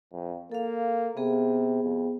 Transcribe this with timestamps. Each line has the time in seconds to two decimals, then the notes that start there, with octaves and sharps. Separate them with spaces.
0.12 F2
0.52 A#3 A4 F5
1.17 C3 B3 G#4
1.84 F2